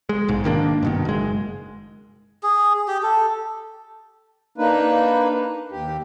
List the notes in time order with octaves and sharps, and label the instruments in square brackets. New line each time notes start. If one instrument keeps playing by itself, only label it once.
[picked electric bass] G#3
B1 G#2
G#1 D#3 A#3 D4
G2 B2 D#3
F#1 G#3
[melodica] G#4
G4
A4
[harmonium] A#3 D4 D#4 B4
D#2 G4